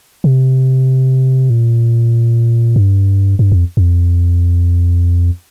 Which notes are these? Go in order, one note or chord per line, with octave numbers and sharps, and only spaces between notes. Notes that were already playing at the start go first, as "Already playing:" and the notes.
C3
A#2
G2
G2
F2
F2